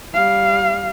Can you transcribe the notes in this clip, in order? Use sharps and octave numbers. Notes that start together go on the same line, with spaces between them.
G3 F5